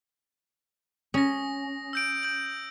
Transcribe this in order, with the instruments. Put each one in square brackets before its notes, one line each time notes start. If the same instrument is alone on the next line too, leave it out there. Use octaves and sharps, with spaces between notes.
[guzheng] C#4 [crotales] D#6 A#6
[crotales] E6 G6 D7
G6 F#7